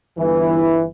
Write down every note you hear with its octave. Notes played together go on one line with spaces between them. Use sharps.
G1 E3